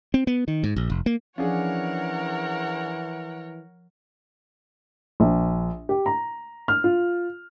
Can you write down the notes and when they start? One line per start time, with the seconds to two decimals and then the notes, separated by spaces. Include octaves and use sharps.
0.14 C4
0.27 B3
0.48 D#3
0.64 G#2
0.76 A#1
0.90 F1
1.06 A#3
1.38 E3 F3 C#4 D4 G#4 A#4 C#5 F#5
5.20 A#1
5.89 G4
6.06 A#5
6.68 F6
6.84 F4